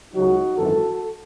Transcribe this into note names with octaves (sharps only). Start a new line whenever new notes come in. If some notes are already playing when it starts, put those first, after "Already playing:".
C#2 C#3 F#3 D#4 F#4
G#1 F#2 E3 F#4 A4